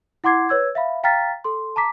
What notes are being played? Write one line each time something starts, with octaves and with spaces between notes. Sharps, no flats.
E4 F#5 C6 D6 G#6 C7
B4 C#5 E6 G#6
E5 F5 B5
F5 G5 A#5 F6 A6 B6
A4 C6
A5 A#5 D6 B6